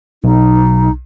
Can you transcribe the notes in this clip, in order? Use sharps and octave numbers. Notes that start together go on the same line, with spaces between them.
B1 D#4